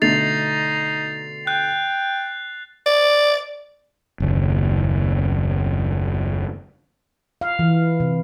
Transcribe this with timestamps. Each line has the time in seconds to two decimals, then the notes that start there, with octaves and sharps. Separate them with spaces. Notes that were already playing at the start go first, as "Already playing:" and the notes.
0.02 B2 D3 A3 D#4 A6 C7 F7
1.47 G5 F#6
2.86 D5
4.20 F#1 D#2
7.41 F5
7.59 E3
8.00 C3